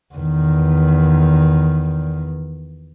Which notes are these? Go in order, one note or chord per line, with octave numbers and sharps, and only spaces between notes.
E2 D#3